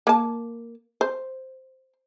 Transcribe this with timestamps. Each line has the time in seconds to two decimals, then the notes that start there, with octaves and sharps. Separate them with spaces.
0.07 A#3 A5
1.01 C5